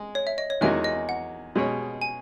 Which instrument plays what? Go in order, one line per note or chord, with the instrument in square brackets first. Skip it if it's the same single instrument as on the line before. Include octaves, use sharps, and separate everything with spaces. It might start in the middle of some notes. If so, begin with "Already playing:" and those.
Already playing: [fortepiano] G#3
[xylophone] C#5
E5
D#5
C#5
[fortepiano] E2 D#3 G#3 D#4 F#4 [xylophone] E5
[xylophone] D#5
F#5
[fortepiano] B2 G#3 C#4 G#4 C#5
[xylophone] G#5